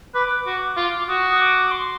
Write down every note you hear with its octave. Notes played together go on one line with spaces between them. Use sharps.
B4 D6
F#4
D6
F4
F#4 D#6
D#6
D6
C6